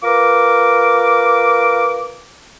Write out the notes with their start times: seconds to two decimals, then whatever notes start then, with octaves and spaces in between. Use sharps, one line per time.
0.03 F4 A#4 B4 D6